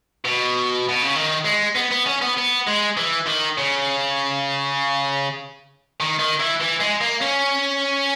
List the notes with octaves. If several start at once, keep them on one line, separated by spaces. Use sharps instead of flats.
B2
B2
C#3
D#3
G#3
B3
B3
C#4
B3
B3
G#3
E3
D#3
C#3
D#3
D#3
E3
E3
G#3
A#3
C#4